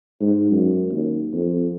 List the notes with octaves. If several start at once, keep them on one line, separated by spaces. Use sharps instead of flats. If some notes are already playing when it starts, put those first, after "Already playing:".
G#2
F#2
D#2
F2